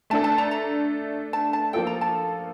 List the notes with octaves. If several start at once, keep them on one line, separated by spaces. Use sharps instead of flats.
A3 D4 A4 A5
A5
A#5
A#5
A5
A5
F3 A#3 F4 A4 G5
A#5
A5